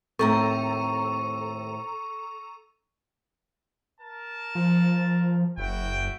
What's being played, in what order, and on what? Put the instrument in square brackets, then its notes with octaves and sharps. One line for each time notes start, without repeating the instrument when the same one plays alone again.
[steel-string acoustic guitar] D#2 A2 C4 [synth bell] A4 A#5 [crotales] C#6
[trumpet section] A#4 A5
[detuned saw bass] F3
[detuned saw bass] F#1 [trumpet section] E4 F#4 G5